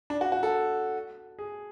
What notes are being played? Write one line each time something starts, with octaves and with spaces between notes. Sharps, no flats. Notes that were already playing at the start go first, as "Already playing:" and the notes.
D4
F#4
F#4
A4
G#4